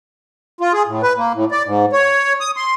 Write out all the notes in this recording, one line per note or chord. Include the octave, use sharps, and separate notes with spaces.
F4
G#4
A2
B4
A#3
A2
D5
G#2
C#5
D#6
C6